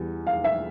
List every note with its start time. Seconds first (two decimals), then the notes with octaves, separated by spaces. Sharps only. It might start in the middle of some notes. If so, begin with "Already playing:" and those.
Already playing: E2 E3 G3
0.27 F5
0.44 E5